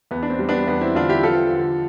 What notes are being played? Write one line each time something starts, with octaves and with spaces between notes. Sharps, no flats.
E2 B3
D4
C4
G3
B3 D4
E2 B3
C4 E4
D3 D4 F4
E4 G4
F3 F4 A4
D3